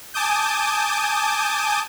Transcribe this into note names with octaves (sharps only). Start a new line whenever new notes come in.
G#5 A5 D6 D#6 G6